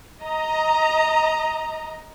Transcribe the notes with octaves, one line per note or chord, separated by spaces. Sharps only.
D#5 A#5